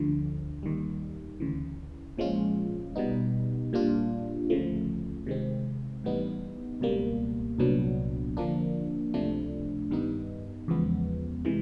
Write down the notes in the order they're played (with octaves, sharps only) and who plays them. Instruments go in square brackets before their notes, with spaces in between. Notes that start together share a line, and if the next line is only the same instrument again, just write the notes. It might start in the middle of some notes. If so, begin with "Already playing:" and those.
Already playing: [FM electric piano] D2 D3 F3
D#2 D#3 G3
D2 C#3 E3
A#2 F3 G#3 C#4 F4
B2 G3 B3 D#4
A#2 G3 A#3 D4 F4
D2 C#3 F3 A3
C3 D#3 G#3 C4
A2 E3 G3 B3 D#4
C#2 B2 G3 A#3
C2 A#2 F#3 B3 D4
D3 F3 A#3 D4
C#2 C3 F3 A3 D4
G2 D#3 G3 B3 D#4
E2 C#3 F3 G#3 B3
C3 E3 G#3